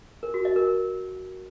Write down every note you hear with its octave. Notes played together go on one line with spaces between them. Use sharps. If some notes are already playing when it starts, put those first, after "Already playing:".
A#4
F#4
D#5
A#4
A#4